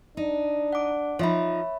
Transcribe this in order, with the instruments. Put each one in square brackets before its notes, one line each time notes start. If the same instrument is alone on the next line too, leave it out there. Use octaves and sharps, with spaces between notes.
[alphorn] D4 [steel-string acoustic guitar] D#4
[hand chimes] F#5 D6
[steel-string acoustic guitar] F3 D#4 [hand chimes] C#5 E5 B5